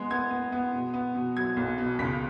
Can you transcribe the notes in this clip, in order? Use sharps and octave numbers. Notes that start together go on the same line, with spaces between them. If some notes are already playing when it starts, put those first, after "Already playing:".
Already playing: G#3 B3
B3 G#6
B3
B3
B2
B3
B2
F#3 G#6
B1
B2
C#2 B6